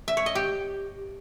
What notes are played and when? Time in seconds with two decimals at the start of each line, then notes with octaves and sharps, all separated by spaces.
0.08 E5
0.17 C#5
0.26 D#5
0.35 G4